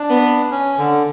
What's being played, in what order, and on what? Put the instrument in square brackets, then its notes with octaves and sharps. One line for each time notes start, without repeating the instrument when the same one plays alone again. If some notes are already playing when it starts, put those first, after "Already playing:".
Already playing: [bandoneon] D4
[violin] B3
[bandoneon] C#4
D3